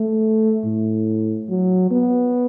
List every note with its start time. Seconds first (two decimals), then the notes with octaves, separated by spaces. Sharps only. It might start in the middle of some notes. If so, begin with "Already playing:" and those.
Already playing: A3
0.64 A2
1.49 F#3
1.91 B3